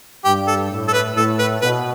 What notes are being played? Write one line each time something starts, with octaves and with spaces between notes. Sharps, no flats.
G2 G4
A4
A2
A4
B4
A2 A4
B4
B2 B4